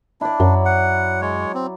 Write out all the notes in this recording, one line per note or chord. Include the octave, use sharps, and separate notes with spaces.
D4 E4 D5
F#2 F#3
F#5
G#3 C#5
C4